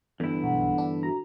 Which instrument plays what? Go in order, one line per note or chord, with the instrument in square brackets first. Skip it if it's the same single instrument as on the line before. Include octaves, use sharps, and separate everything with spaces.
[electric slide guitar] E2 G2 E4 [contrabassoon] D3
[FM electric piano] B1 [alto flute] F#5
[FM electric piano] D4
[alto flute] F#4 [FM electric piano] A#5